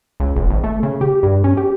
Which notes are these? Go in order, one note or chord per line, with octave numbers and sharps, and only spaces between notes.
C#2
F1
G#1
A3
C#3
G4
G2
C#4
G4